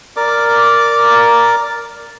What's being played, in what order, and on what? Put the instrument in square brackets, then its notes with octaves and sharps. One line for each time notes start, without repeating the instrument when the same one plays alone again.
[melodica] A#4 D5 D6